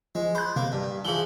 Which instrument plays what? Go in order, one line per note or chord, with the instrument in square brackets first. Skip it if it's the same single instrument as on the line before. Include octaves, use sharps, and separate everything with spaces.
[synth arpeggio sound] F3 [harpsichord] G#3
[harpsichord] C5 [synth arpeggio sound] B5 F#6
[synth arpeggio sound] C3 [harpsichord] A#3
[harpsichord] G2
[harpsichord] E3 F3 [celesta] G#4 F#7 G7